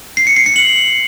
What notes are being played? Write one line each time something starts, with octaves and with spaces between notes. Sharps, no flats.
C7
C#7
C7
C#7
F#7